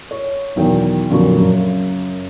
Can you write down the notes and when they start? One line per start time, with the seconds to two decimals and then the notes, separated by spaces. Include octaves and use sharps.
0.11 C#5
0.56 B1 E2 D#3 G5
1.10 F2 A#2 D3 F#3 C#6
1.39 F#2 C#3